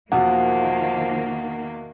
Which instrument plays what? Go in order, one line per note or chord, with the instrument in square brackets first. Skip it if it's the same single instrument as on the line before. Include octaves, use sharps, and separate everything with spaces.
[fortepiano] E2 B2 [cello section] D#3 A#3 [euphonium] F3 [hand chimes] F#5